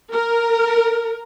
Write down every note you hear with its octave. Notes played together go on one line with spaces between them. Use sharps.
A#4